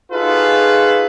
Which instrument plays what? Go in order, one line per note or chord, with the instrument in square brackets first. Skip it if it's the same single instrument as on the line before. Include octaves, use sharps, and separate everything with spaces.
[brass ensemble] D#4 F4 F#4 G#4 A4 B4